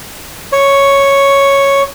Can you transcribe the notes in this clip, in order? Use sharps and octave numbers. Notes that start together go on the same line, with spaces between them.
C#5